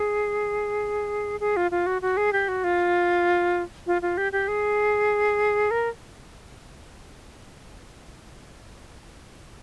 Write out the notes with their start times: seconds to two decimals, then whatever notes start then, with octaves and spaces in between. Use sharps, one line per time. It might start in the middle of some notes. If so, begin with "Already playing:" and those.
Already playing: G#4
1.40 G#4
1.57 F4
1.71 F4
1.86 F#4
2.02 F#4
2.17 G#4
2.33 G4
2.48 F#4
2.64 F4
3.87 F4
4.02 F4
4.17 G4
4.32 G4
4.48 G#4
5.71 A#4